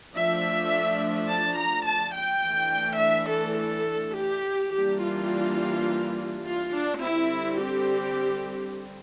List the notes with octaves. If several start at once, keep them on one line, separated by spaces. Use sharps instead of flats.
F3 A3 D4 E5
A5
A#5
A5
G5
E3 A3 D4
E5
A4
A4
G4
E3 G3 A#3 D4 G4
F4
F4
D4
D3 G3 C4 E4
G4